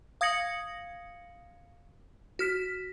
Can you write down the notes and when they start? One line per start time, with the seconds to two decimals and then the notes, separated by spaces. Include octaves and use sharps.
0.21 F5 D#6 G#6 A#6 C#7 F#7
2.39 F#4 F6 B6